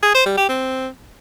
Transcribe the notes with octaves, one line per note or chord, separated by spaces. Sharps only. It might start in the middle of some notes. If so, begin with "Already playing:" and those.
G#4
C5
G3
G4
C4